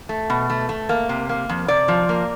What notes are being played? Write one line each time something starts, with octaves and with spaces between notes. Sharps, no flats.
A3
B2
A3
A3
A#3
C3
A#3
F2
C3 D5
F3
A#3